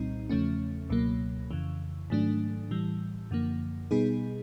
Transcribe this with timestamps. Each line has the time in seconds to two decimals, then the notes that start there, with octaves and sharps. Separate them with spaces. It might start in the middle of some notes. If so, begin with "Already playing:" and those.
Already playing: C2 A#2 G3 C4 D#4
0.29 E2 C#3 F3 A3 C#4
0.90 C#2 B2 F#3 A#3
1.51 F2 C#3 E3
2.10 G#2 D#3 F#3 A3 D4
2.71 A2 E3 G3
3.31 F#2 D3 F3 A#3
3.91 B2 G3 B3 D#4 G#4